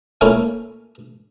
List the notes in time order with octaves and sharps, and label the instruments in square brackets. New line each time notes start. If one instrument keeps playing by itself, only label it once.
[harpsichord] A3 A#3 C#4 E4 F4